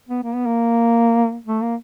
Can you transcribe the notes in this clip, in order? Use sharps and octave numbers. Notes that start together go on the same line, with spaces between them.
B3
A#3
B3
A#3
A3
A#3